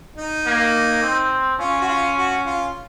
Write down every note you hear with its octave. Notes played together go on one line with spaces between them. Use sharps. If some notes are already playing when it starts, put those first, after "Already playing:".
D#4
A#3
C4
C#4 F4
F#4
F4
F#4
F4